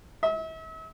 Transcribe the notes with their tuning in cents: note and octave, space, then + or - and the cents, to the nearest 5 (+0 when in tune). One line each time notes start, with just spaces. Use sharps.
E5 -40